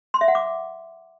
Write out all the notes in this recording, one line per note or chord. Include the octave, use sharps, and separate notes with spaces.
C6
E5
F#5
D6